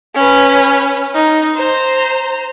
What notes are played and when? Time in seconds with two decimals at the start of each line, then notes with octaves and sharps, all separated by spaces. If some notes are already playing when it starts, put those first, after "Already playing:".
0.15 C#4 B4
1.14 D#4
1.56 C5 A#5